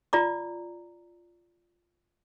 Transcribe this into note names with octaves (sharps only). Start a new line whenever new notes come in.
F4 D5 A#5 D6